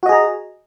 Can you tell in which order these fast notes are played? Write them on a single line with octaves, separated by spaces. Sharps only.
F#4 D#5 G#4 A#5